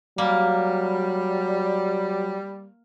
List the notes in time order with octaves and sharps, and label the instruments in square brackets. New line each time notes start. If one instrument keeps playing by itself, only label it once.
[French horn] F#3 [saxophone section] G3 [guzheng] A#3